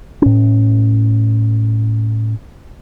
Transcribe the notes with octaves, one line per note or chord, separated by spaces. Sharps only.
A2 C#4